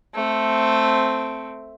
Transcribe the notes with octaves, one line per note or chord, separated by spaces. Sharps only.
A3 C4